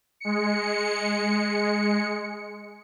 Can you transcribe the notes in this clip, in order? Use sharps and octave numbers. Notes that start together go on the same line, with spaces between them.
G#3 C#7